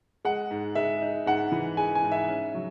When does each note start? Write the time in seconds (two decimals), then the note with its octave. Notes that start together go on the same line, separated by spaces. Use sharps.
0.25 G#3 F#5
0.51 G#2
0.75 G#3 E5
1.02 D#4
1.26 G#2 F#5
1.52 E3
1.77 G#3 G#5
1.95 G#5
2.03 G#2
2.11 E5
2.28 C#4
2.55 F#3